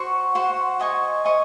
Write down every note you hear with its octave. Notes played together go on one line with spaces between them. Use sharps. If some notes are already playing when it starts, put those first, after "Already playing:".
Already playing: F#4 C5 F#5 C#6
F#4 C5 F#5 C#6
C5 D#5 G#5 C#6
C5 D#5 G#5 C#6